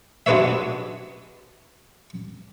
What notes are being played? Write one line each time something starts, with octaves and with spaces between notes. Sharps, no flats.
F#3 G#3 D4 B4 C#5 E5